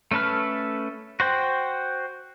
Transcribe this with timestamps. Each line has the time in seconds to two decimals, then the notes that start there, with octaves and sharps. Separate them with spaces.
0.11 A3 C#4 A4 B4 F6
1.20 F#4 C5 G5